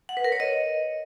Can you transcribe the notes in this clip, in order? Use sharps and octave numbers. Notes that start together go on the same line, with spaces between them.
F#5
B4
A#4
C#5
D#5